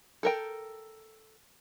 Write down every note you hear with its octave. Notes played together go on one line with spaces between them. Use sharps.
A4 A#4 G5